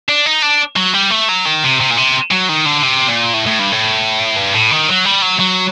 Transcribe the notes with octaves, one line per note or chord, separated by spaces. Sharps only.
D4
D#4
D4
F#3
G3
A3
F#3
D#3
C3
C3
A#2
C3
F#3
D#3
D3
C3
A#2
A2
A2
G2
A2
G2
A2
D#3
F#3
G3
F#3
F#3